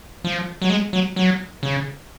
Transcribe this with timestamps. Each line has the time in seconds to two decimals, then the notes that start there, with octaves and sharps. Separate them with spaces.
0.24 F3
0.62 F#3
0.70 G#3
0.93 F#3
1.16 F#3
1.63 C#3